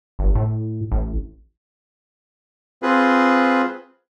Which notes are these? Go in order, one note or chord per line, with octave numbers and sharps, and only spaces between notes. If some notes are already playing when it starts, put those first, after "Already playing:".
G1
A2
A1
C4 F4 G#4 B4